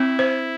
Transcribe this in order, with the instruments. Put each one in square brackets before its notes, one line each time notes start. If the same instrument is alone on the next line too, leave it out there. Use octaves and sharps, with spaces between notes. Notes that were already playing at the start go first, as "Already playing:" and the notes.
Already playing: [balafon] C4 [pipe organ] E4
[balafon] C5